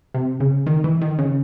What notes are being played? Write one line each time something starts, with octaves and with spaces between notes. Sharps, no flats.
C3
C#3
D#3
E3
D#3
C#3